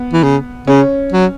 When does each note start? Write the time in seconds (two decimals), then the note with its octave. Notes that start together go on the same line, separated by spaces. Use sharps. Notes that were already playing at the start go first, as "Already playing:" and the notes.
Already playing: B3
0.13 E3
0.23 C#3
0.67 C#3 C#4
1.12 F#3